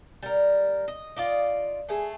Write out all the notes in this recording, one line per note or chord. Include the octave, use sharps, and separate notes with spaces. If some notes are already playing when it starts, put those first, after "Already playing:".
G3 A#4
D#5
F4 D5 D#5
A3 G#4